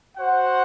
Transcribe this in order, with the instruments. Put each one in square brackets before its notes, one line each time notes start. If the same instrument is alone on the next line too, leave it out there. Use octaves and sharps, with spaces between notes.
[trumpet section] F#4 C5 F#5